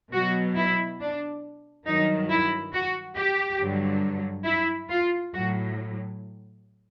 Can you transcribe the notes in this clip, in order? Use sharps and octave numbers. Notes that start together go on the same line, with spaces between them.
B2 F#3 F#4
E4
D4
G2 D#3 F#3 D#4
E4
F#4
G4
G2 D3 F#3
E4
F4
A2 F#3 F#4